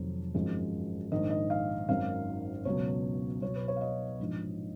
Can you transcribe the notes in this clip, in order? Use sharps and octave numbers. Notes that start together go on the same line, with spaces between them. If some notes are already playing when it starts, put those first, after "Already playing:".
Already playing: F1 F2 D#3 F#3
G#1 F#2 F3 G#3
A#1 G#2 D#3 D#5
D#5
F5
G#1 F#2 D#3 F#3 F5
C#2 B2 F#3 C#5
B1 B2 F#3 C#5
B4
C#5
F5
D#5
A#1 G#2 F3